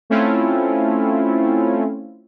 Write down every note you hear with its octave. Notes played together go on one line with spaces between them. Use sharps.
A3 C4 C#4 E4 F4